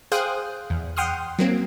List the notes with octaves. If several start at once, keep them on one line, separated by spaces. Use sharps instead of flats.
G#4 C5 F5 G5 D#6 F#6
E2
F#5 G5 C6 D#6 F6
F#3 A#3 C4